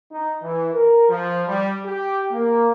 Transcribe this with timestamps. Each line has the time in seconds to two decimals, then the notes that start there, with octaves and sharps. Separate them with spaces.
0.12 D#4
0.42 E3
0.73 A#4
1.09 F3
1.47 G3
1.85 G4
2.32 A#3